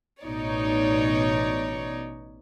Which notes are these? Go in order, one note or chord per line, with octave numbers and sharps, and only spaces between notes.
A1 B2 D#4 C#5 D5